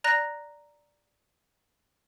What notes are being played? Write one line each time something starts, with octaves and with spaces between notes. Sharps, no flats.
D5 A#5 F#6 A#6